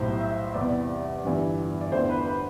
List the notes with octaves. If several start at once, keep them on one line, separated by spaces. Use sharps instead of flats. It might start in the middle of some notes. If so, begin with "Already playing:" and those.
Already playing: B1 A2 G3 C5
E5
E2 C3 G3 D5
G1 G2 E3
D5
E2 D3 A3 C5
B4
B4